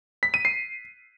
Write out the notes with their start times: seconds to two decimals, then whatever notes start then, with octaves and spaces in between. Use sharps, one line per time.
0.23 B6
0.34 D#7
0.45 C7